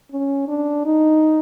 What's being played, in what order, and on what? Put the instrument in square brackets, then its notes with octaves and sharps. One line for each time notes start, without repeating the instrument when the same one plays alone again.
[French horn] C#4
D4
D#4